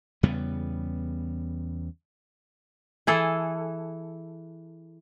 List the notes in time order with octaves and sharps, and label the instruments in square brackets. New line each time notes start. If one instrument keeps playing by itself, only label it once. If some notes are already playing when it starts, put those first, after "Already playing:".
[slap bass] E2 C#3 G3 B3
[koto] E3 G#4 A4